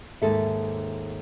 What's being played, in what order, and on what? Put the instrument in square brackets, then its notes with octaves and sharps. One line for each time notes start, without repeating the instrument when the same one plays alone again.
[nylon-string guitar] D#2 G#2 A4 E5